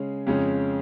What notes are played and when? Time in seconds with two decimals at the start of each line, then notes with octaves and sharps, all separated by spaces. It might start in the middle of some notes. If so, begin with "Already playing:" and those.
Already playing: C#3 G#3 C#4
0.27 F2 C#3 G#3 C#4